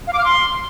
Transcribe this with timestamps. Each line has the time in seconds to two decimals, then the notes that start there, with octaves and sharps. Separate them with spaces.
0.07 F5
0.13 D6
0.19 F6
0.24 C6